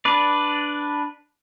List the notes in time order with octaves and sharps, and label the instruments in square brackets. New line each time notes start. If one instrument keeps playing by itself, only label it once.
[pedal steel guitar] D4 B4 D5